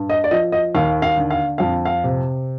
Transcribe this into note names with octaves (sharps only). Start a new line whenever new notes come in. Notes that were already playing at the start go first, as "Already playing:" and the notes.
Already playing: G2
D#5
D5
F3 D#5
D#5
D#2 F5
F5
D3
F5
F2 F5
F5
C3